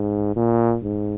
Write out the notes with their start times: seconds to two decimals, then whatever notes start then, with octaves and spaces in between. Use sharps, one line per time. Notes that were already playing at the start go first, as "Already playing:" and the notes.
Already playing: G#2
0.36 A#2
0.83 G#2